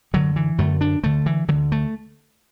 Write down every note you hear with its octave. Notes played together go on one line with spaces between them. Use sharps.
F#2 D3 F#3
E3
F#2 D3 A3
D4
D2 D3 A3
E3
D2 D3 F#3
A3